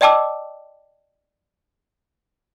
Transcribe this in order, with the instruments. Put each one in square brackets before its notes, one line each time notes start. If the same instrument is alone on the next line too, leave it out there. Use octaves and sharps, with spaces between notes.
[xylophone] D5 D#5 G5 A5 D6 E6